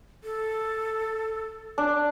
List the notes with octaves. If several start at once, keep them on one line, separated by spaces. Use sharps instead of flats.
A4
D4